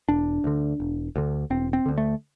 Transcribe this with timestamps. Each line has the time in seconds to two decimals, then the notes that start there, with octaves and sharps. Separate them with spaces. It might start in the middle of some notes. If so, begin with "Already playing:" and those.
0.09 E1 D4
0.44 D2 D3
0.80 E1
1.16 D2 D3
1.50 E1 C4
1.73 C4
1.86 D2 D3
1.98 A3